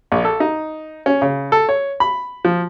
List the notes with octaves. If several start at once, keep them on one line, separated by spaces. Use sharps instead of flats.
A#1
A4
D#4
C#4
C#3
A4
C#5
B5
F3